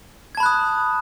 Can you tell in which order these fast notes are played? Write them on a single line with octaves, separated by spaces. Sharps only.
G#6 A5 B5 F#6 D#6